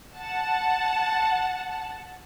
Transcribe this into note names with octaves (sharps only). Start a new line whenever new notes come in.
F#5 A5